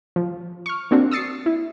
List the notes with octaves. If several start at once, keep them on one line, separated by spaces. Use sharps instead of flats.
F3
C#6 F6
A#3 C4 D4 F#4
D#6 E6 A6 C7 C#7
E4